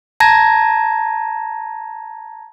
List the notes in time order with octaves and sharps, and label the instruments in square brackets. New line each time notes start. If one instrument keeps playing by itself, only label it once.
[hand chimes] A5 A#5 G#6 A#6